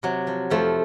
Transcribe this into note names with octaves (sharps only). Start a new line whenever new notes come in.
C3 F#3
F3
F2 F3 A3